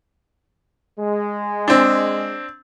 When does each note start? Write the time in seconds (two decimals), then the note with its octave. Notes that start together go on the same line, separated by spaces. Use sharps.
0.99 G#3
1.68 C4 D4